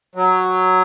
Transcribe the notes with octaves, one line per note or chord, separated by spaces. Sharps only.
F#3